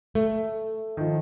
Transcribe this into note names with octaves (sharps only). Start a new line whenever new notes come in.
A3
D#3 F3